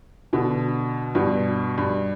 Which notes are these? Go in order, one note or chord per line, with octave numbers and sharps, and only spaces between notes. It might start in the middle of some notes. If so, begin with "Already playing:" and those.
B2 D3
G2 B2
G2